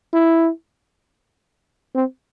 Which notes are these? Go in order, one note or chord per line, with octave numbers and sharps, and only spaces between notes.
E4
C4